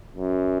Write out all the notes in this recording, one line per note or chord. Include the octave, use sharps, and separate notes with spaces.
F#2